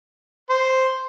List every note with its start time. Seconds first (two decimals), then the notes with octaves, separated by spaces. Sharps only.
0.50 C5